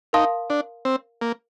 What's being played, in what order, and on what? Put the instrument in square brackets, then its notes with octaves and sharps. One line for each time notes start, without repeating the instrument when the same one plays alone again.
[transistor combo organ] D#4 [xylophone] A#4 F5 A5 C6 D#6
[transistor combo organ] D4
C4
A#3